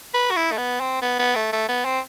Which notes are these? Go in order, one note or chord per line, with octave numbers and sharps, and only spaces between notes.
B4
F#4
E4
A3
B3
C4
B3
B3
A3
A3
B3
C4